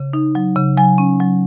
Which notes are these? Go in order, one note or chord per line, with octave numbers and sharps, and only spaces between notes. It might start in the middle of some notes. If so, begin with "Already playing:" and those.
Already playing: C#3
D#4
F#3
C#3
F#3 G#5
C#4
F#3